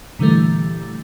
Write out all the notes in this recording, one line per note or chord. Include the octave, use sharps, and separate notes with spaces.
A#2 D3 E3 G3 A3